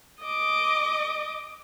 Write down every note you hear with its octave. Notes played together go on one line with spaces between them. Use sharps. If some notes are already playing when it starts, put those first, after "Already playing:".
D#5 D6